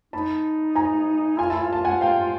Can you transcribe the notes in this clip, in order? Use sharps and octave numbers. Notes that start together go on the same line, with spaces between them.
D#4 A5 B5
G#5 A#5
F4 G#5
E4 A5
F4 G#5
A5
F#5 G#5
F5 G5